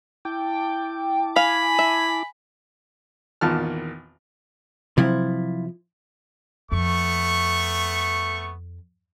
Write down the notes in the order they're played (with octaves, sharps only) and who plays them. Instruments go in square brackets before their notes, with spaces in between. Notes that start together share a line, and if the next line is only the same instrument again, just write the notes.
[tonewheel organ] E4 A5 D6 [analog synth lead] G5
[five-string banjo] F5 [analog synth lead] G#5 [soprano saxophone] B5
[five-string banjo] E5
[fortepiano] G#1 E2 A#2 D#3 A5 F6
[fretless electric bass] C3 F#3 C4 [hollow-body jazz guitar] F3 E4
[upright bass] F2 [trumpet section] A3 B3 C#6